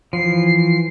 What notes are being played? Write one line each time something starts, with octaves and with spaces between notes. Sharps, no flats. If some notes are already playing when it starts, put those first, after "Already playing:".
E3 F3 C7